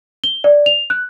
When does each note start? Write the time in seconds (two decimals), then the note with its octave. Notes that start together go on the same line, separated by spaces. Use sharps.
0.24 G7
0.44 D5
0.66 F7
0.90 F#6